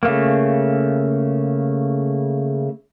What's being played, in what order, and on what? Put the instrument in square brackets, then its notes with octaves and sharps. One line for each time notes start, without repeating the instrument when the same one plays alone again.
[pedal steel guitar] C#3 A3 A#3